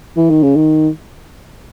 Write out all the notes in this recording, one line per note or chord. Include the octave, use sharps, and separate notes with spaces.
E3
D#3
C#3
D#3